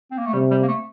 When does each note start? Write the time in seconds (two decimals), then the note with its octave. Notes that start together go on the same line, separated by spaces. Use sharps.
0.11 C4
0.18 A#3
0.26 A3
0.33 C3 G3
0.51 G3
0.63 A#3
0.68 A3